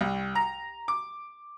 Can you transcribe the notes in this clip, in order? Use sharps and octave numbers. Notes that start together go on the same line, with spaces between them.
C2
A#5
D6